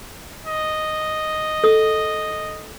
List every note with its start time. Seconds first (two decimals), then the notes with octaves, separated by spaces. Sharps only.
0.46 D#5
1.64 A4 D#6